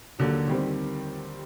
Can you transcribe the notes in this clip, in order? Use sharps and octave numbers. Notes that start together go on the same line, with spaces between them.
D#2 D3 F#3
D#3 G3 C4